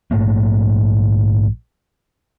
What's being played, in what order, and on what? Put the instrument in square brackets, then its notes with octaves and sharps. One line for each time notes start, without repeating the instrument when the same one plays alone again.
[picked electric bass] A#1 G#2 A3 A#3